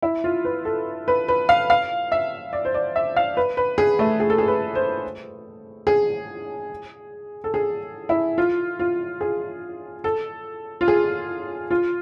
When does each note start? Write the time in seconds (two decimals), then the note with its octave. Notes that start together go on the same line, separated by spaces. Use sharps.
0.02 E4
0.24 F4
0.45 B4
0.65 A4
1.08 B4
1.28 B4
1.49 F5
1.70 F5
2.12 E5
2.53 D5
2.65 C5
2.74 D5
2.96 E5
3.16 F5
3.37 B4
3.57 B4
3.78 G#4
3.99 A3
4.20 G#4
4.30 A4
4.38 G#4
4.48 B4
4.75 C5
5.87 G#4
7.44 A4
7.54 G#4
8.09 E4
8.38 F4
8.79 F4
9.21 G#4
10.04 A4
10.81 F4
10.88 G#4
11.71 F4